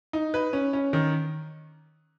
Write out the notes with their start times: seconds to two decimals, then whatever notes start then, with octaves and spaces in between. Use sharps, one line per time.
0.13 D#4
0.34 B4
0.53 C#4
0.73 C#4
0.93 D#3